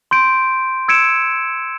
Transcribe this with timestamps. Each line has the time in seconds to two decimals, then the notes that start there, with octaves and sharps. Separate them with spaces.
0.11 C6 G6 D7
0.88 E6 G#6 C#7 D7 E7